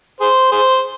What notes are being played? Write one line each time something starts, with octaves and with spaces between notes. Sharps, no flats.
G#4 C5
G#4 C5